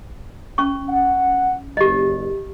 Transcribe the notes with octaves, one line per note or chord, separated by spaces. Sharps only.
C#4 C#6
F#5
F#1 G4 D#5